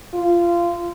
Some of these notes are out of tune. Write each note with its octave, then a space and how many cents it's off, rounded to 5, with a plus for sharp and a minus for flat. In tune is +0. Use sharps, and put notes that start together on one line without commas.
F4 -20